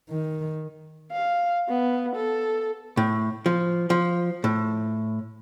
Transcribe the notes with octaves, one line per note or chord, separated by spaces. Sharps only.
D#3
F5
B3
A4
A2
F3
F3
A2